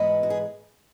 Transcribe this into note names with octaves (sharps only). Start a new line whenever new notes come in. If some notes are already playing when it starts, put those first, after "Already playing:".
Already playing: G#2 E3 G#3 B3 B4 D#5
F#4
G#4